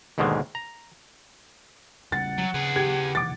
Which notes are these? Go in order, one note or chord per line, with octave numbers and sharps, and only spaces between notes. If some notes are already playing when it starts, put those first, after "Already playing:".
D#2 G#2 B2 D3 D#3 G#3
A#5
C#3 G3 F#5 A6
F#3
C#3 G#4 B4
G4 G#6
C3 D#3 E3 D6 A6